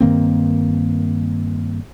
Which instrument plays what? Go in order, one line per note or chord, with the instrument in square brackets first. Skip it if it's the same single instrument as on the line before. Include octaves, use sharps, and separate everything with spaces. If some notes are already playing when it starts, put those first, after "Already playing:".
[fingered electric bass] G2 D#3 A#3 C4